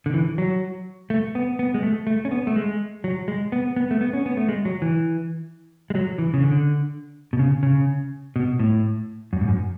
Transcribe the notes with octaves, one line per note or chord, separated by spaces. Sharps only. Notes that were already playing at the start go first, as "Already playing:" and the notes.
D3
E3
F#3
A3
B3
B3
G#3
A3
A3
C#4
B3
A3
G#3
F#3
G#3
B3
B3
A3
B3
C#4
B3
A3
G#3
F#3
E3
G#3
F#3
E3
C#3
D3
B2
C#3
C#3
B2
A2
F#2
G#2
F#2